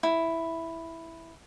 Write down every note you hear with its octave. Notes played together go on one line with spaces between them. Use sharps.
E4